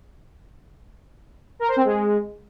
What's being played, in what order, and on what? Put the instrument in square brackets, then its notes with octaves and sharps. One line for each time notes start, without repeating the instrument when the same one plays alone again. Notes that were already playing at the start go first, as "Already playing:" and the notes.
[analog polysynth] A#4
C5
C4
G#3